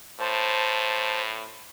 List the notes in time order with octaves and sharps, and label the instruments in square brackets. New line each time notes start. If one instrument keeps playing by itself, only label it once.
[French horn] A2 [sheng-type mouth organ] C5 A5